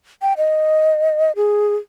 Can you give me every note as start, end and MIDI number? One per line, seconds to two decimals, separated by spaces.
0.22 0.33 79
0.37 1.32 75
1.36 1.76 68